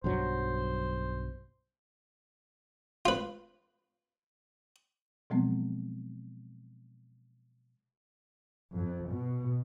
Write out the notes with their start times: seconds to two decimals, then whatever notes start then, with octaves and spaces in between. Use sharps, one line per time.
0.04 B1 G2 F#3 C5
3.05 F4 B4
5.30 B2 F3 F#3 G#3 B3 C4
8.75 F2
9.13 B2